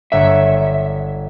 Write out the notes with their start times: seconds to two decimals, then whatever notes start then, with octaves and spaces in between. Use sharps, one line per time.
0.12 G1 C#5 E5 F#5